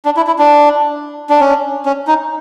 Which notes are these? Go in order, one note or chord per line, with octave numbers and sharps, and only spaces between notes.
D4
E4
E4
D4
D4
C#4
C#4
D#4